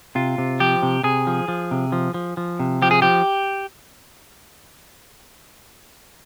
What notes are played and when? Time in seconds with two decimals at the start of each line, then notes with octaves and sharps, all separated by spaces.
0.15 C3 F4
0.38 C3
0.60 F3 G4
0.83 C3
1.03 C3 G#4
1.27 F3
1.48 F3
1.71 C3
1.92 F3
2.14 F3
2.37 F3
2.60 C3
2.82 F3 G4
2.91 G#4
3.02 F3 G4